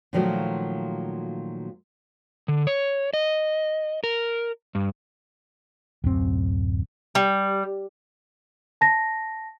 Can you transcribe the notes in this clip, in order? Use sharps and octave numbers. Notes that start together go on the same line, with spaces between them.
A#2 D#3 F3 F#3 A3 F#4
D3
C#5
D#5
A#4
G2
D1 F#2 C4
G3
A5 A#6